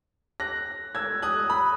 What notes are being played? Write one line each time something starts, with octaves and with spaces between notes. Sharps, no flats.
F#6 A#6
E6 G#6
D#6 F#6
B5 D#6